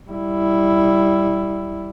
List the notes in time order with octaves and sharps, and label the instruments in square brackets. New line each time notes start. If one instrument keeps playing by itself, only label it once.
[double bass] G3 E4